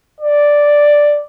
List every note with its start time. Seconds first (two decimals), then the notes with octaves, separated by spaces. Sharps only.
0.21 D5